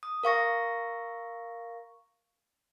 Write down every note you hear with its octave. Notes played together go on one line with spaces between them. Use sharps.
D#6
A#4 F5 C#6 A#6